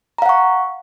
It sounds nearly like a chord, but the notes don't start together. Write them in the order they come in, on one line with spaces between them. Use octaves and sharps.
A#5 F5 F#5 C#6